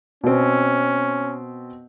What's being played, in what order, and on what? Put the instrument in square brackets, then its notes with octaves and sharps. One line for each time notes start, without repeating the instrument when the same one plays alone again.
[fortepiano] B2 C4 [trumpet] C#4